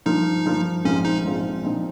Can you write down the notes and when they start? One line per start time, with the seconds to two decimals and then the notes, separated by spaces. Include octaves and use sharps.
0.06 G2 F3 A#3 D#4
0.46 G2 F3 A#3
0.85 A#1 G#2 F3 C4 C#4 F4
1.05 D#4
1.24 A#1 G#2 F3 C4 F4
1.63 A#2 F3 C4 D#4